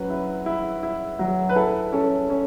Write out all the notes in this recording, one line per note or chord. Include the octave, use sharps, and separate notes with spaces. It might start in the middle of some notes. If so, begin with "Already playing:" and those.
Already playing: F#3 C#4 B4
E4
E4
E4
F#3
B4
E4 A4
C#4 A4
C#4